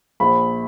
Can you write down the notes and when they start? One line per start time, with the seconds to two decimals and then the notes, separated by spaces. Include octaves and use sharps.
0.20 A#1 B5